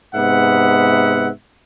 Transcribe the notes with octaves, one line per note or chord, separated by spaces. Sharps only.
G#2 C3 B3 E5 F#5